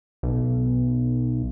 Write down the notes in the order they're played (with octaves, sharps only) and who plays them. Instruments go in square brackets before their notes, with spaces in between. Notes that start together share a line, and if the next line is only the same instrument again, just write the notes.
[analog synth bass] B1